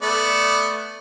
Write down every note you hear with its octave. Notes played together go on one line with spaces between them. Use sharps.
A3 B3 D5